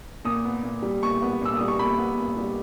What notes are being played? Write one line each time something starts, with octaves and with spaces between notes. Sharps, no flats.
A#2 D#6
B3
A#2
G3
A#2 C#6
B3
A#2 E6
G3 D#6
C#6
A#2 B5
B3
A#2
G3